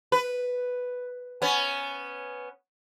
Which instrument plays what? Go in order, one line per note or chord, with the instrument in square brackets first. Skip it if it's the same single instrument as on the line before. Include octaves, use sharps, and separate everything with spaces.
[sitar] B4
B3 C#4